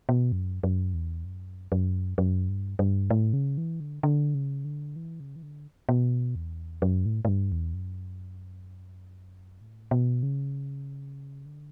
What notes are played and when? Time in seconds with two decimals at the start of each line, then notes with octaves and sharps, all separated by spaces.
0.09 B2
0.32 F#2
0.63 F#2
0.94 E2
1.25 F#2
1.72 F#2
2.18 F#2
2.49 G2
2.79 G2
3.10 A2
3.33 C#3
3.58 E3
3.80 D3
4.03 D3
4.35 C#3
4.65 D3
4.96 E3
5.20 C#3
5.36 E3
5.43 D3
5.89 B2
6.35 E2
6.82 F#2
7.06 A2
7.25 A2
7.28 G2
7.52 E2
7.74 F#2
9.61 A2
9.91 B2
10.23 C#3
11.46 D3